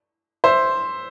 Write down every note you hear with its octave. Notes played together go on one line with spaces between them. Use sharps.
C5 E5